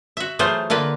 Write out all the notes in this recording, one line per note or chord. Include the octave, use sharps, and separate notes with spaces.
F#4 E5
E3 F#3 A3 F4 G#4 C5
D3 A#3 F4 B4